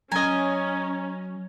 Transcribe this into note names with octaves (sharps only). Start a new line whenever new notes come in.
F#3 C#4 D#5 G#5 A#5 G#6